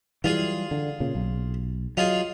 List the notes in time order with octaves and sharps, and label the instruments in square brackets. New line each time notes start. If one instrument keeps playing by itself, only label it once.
[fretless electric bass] E3 F#3 G3 [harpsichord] F4 G#4
[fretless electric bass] D3
A#2 C#3
B1
[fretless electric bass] F#3 [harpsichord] D#4 F4 G#4